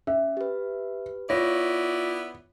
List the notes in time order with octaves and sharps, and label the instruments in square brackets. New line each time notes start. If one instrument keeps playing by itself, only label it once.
[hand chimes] C#4 [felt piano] E5
[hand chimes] G4 B4
[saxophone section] B3 E4 D5 [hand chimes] F4 C#6 A#6 [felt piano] C#5